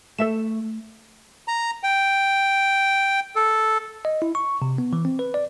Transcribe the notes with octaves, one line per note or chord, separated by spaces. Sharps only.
A3 A4 E5 E7
A#5
G5
A4
D#5
E4
C#6
C3
B3
E3
C4
B4
D5